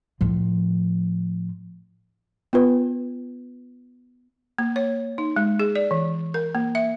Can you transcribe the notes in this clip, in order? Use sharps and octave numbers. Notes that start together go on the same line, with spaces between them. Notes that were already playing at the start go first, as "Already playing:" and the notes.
A2 F3
B3 F4 B4
A#3
C#5
D#4
G#3
G#4
D5
E3
A#4
A#3
E5